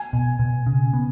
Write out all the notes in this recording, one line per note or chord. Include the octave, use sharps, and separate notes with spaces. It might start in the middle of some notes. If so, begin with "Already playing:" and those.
Already playing: G#5
B2
B2
C#3
B3